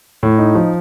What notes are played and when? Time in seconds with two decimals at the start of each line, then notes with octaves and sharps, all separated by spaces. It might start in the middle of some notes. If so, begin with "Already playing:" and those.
0.23 A2
0.38 D#4
0.55 F3